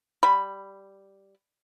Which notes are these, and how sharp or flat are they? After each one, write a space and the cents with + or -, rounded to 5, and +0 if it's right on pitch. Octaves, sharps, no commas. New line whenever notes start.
G3 -5 B5 +0